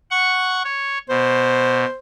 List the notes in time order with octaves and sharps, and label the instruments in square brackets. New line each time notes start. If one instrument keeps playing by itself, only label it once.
[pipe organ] F#5 C#6
C#5
[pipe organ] B2 [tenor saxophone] C5